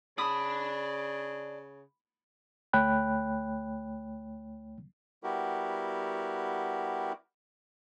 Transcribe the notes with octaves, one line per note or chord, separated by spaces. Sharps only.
C#3 D5 A5 B5 D#6
D2 A3 C#5 G5 B5 F#6
G3 B3 E4 F#4 G4 A#4